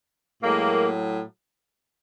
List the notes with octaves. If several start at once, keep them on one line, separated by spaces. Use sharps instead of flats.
A2 F#3 G#3 A#3